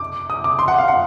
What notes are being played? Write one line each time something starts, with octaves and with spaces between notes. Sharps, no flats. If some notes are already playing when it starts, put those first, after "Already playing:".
Already playing: D6
D#6
D6
C6
F#5
F5
F#5